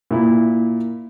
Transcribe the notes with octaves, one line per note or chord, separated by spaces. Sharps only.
A#2 E4